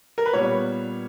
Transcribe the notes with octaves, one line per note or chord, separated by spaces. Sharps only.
A#4
B4
A#2 G3 B3 C#5